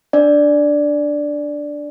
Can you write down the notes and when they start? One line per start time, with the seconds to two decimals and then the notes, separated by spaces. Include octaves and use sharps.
0.13 D4 D5